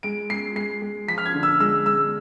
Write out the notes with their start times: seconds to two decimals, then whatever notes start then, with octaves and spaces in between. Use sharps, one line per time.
0.03 G#3 D7
0.30 G#3 C7
0.56 G#3 C7
0.82 G#3
1.08 F3 B6
1.18 F6
1.26 G#6
1.34 D3
1.43 E6
1.60 G#3 E6
1.86 G#3 E6